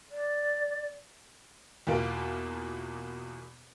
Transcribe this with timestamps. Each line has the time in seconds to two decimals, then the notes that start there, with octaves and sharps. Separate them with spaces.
0.11 D5
1.87 E2 B2 A#3 F4 D7